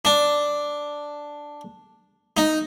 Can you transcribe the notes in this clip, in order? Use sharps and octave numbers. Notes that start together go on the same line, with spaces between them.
D4
D#4